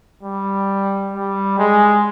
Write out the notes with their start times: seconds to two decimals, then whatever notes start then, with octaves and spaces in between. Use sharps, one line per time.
0.23 G3
1.13 G3
1.58 G#3